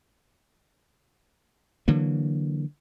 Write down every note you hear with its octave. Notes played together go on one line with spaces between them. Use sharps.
D3 E3 F#3 A#3